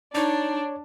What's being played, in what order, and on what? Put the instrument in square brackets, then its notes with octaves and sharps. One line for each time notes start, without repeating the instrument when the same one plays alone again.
[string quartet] D4 [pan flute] D#4 [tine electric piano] C#5 D5